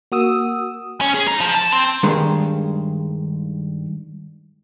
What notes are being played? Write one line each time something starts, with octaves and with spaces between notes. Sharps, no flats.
A#3 F#4 D#6 E6
C#4
G#4
D#4
F3
A5
C4
G2 D#3 G#3